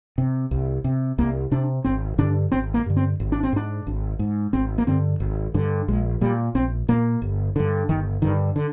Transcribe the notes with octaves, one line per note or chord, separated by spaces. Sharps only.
C3
C2
C3
C2 A#3
C3 D4
G#1 C4
G2 D3 D4
G#1 C4
A#3
G2 D3
C4
G#1
D4
C4
G#2 D4
G#1
G#2
G#1 C4
A#3
G2 D3 C4
G#1
G2 D3
A#1 G#3
A#2 G3
A#1 C4
A#2 A#3
G1
G2 D3
G1 D#3
G2 D3 D#3
D3